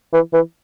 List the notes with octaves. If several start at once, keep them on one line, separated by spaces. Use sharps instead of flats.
E3
E3